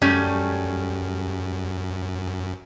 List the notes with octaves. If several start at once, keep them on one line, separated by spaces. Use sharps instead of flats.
F#2 G3 A3 C#4